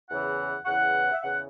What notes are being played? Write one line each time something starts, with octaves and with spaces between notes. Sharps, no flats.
E2 C#3 E3 F#5
E2 C#3 E3 F#5
E5
E2 C#3 E3 F#5